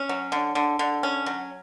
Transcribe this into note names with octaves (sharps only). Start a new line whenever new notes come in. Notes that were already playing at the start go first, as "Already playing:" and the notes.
Already playing: C#4
F#3
D3
D3
D3
C#4
F#3